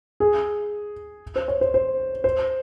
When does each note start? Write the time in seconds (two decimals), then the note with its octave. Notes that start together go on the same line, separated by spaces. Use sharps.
0.20 G#4
1.36 C5
1.48 C#5
1.61 C5
1.74 C5
2.24 C5